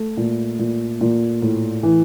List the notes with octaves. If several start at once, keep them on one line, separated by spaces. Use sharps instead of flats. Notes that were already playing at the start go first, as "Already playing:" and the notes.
Already playing: A3 A4
A#2
A#2
A#2
A2
E3